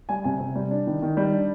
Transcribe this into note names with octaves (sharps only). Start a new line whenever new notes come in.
G3 G#5
C3 G#5
C3
G3
D4
D#3
D#3
G3
D4